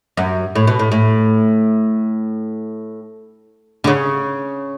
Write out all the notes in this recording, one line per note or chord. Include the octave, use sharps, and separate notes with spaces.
F#2
A2
B2
A2
A2
D3
C#3